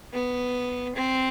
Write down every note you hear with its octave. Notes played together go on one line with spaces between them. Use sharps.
B3
C4